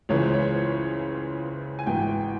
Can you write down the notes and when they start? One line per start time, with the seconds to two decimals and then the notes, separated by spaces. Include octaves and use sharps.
0.09 C#2 C#3 E3 G#3 C#5
0.21 C5
0.34 C#5
1.79 G#5
1.87 G#1 G#2 E3 G5